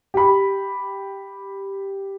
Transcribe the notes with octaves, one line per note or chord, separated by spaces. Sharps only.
G4 B5